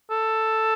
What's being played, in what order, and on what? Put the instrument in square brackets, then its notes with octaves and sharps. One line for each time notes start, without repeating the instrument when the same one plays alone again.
[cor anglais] A4